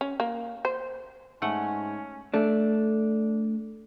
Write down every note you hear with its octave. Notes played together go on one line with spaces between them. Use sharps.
C#4
A#3
C5
G#2 A3 C#4 F#5 G#5
A3 D4